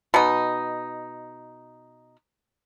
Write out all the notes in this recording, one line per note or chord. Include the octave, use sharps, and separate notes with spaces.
B2 D#4